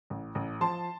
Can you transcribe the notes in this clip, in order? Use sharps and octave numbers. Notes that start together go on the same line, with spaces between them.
A1
A1
F3 A5 C6